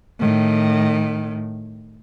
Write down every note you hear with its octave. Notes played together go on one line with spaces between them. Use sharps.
A2 D#3